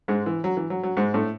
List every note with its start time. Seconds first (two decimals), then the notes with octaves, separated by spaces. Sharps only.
0.08 G#2 G#3
0.26 E3
0.44 F#3
0.57 E3
0.70 F#3
0.83 F#3
0.97 G#2 G#3
1.14 A2 A3